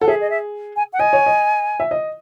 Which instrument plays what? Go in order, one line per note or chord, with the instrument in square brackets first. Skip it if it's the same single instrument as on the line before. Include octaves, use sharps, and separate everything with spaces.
[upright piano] A4 [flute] F#5
[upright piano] G#4 [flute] E5
[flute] D#5
E5
G#5
F#5
[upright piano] D#5 [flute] G#5
[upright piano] C#5
D#5
E5
D#5